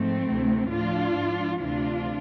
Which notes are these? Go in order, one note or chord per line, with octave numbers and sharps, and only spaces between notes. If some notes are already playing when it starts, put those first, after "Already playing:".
Already playing: G#2 F3 A3 C4
D2 C3 E3
A2 F3 D4 F4
G#2 F3
D2 C3 E3 D4 F4